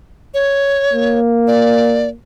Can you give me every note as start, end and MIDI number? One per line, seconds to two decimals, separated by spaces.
0.34 1.19 73
0.93 2.16 58
1.47 2.09 74